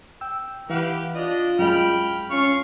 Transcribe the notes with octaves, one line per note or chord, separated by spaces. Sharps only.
G5 E6
E3 G4 B4 F5 F#5
D4 F4 D#5
F#2 G#3 G5 B5 F6
C#4 F4 C#6 F6